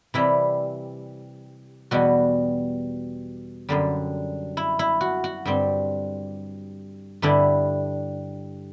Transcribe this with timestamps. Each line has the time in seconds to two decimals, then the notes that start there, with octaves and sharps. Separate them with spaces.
0.14 C3 E3 G3 E4
1.91 E2 B2 G3 F#4
3.69 F#2 D3 G3
4.57 E4
4.79 E4
5.01 F#4
5.24 F#4
5.45 G2 D3 G3 C4
7.22 G2 D3 G3 D4 E4